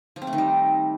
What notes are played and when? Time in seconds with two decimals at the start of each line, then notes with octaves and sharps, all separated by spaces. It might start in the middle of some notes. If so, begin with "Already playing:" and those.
0.16 F3
0.22 C4
0.27 A3
0.33 D#3
0.38 G3